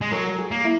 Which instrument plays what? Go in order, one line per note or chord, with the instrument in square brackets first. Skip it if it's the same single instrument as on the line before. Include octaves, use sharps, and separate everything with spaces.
[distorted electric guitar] G#3
[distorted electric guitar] F#3 [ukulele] A#4
[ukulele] G#4
[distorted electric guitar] A#3
[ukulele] E4